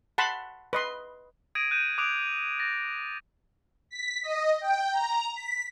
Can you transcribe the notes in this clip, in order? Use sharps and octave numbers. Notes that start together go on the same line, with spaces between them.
F#5 A5 B5 C6
B4 D#5 C6
D#6 G#6 A#6 D7 D#7
F#6 G6 D#7 E7
D6 D#6 F#6 D7 F7
A6 A#6
B6
D#5
G5
A#5
B6